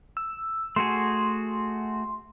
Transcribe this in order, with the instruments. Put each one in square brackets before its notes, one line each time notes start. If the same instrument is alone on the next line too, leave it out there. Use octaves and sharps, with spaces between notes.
[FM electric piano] E6
[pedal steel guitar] A3 F#4 G#4 [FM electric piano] C6